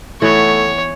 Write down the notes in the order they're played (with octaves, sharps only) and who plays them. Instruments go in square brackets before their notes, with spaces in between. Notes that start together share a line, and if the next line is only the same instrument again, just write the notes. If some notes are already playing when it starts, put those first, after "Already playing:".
[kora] E3 B3 [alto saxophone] A3 [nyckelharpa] C#5